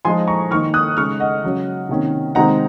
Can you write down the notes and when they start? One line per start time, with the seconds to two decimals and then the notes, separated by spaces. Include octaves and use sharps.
0.05 F3 G#3 D#4 G#5 C6
0.28 A#5 C#6
0.51 D#3 A#3 D#4 C#6 F6
0.74 D#6 F#6
0.97 C#3 G#3 D#4 C#6 F6
1.20 D#5 F#5
1.44 C#3 F#3 C#4
1.89 C3 D#3 A#3 C#4
2.35 C3 D#3 G#3 C4 D#4 F#5 A#5